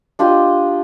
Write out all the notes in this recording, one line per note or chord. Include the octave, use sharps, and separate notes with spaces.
D4 F4 G4 D#5